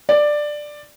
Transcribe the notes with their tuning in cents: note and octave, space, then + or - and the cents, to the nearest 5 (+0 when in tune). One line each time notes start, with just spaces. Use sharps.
D5 +10